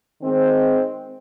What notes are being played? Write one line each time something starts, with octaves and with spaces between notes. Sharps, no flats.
D#3 G#3 C4